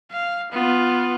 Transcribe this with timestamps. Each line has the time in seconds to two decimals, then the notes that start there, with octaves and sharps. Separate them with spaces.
0.11 F5
0.52 B3 F4